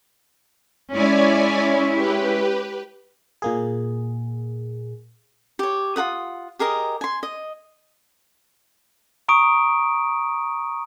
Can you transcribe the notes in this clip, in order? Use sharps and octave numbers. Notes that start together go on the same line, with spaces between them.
G#3 C#4 E4 C#5 D5 G#5
G4 B4
A#2 A#3 G#4
G4 C#5
F4 A#4 F#5 D#6
G4 G#4 A#4 D#5
G#5 C6
D#5
A#5 C#6 D#6 D7